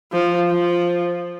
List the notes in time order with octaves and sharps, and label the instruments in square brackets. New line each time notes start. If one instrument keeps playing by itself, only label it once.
[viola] F3
F3